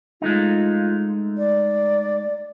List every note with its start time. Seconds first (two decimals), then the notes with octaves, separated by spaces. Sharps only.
0.22 G#3 A3 D#4 F4
1.38 D5